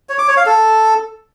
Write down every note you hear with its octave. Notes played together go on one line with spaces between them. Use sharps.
C#5
D6
C#5
F5
A4